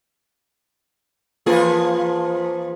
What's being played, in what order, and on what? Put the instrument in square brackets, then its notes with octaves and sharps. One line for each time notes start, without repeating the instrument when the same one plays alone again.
[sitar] E2 F3 G#4 [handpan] A#3 F4 B4